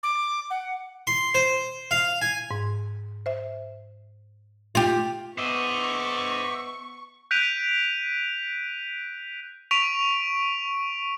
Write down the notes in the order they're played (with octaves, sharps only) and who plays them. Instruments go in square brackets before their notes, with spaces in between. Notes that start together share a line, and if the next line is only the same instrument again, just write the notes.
[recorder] D6
F#5
[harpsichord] C6
C5
F5
G#5
[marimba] G#2
C5 E5
[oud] F4 G4
[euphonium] B3 [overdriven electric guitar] C5 D#5 [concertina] E5 D6 [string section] C#6
[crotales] F#6 G6 B6 D7 D#7 F7
C#6 B6 D7 F7